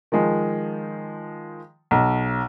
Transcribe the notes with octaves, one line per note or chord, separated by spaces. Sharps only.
D#3 F3 G#3
B1